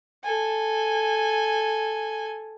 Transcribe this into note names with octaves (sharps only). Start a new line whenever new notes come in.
A4 G#5